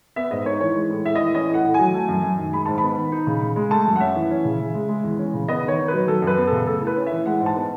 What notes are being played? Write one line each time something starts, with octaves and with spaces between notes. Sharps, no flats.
B3 E5
G#2 D#5
D#4 C#5
E3 C#5
G#3
A2
A2 E5
E3 D#5
C#4 D#5
A2 F#5
A2
F#3 G#5
A3
F#2
F#2
D#3
G#3 B5
G#2 A5
B3 B5
D#3
D#4
C#3
C#3
G#3
A3 A5
F#2
F#5
C#4 E5
E3
C#4
C#3
C#3
G#3
G#3
E2
C#4
C#3
B3 D#5
D#3 C#5
D#4
F#3 B4
F#3 A4
F#2
B4
B3
C#3 A4
A3 A4
A2
B4
C#4
E3 E5
G#3 F#5
G#2
A5
B3